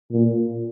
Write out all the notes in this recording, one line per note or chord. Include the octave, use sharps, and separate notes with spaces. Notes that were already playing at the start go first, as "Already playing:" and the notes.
A#2